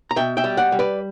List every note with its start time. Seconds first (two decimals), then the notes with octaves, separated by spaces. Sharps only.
0.11 A#5
0.16 B2 E5 G5
0.37 E5 G5
0.44 G3
0.57 D5 F#5
0.72 G3
0.79 B4 D5